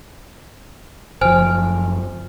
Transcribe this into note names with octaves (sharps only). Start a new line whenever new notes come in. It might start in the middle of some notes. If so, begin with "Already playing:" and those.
F#1 F3 C5 G#5 F6